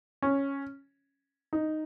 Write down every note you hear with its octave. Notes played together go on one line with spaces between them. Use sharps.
C#4
D#4